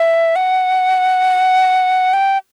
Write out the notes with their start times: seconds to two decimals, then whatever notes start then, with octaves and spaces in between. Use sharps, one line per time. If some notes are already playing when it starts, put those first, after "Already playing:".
Already playing: E5
0.36 F#5
2.13 G5